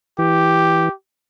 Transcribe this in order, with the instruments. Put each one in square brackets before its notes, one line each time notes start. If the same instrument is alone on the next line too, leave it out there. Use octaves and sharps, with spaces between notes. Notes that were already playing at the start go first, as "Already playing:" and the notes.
[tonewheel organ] E3 [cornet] G4